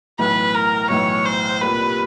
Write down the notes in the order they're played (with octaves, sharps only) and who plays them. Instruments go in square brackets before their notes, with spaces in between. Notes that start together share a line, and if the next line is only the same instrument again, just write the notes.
[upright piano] B1 A2 E3 [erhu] B4
[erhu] A#4
[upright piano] B1 A2 E3 [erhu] C#5
[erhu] C5
[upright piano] C2 A#2 G3 A#3 [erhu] B4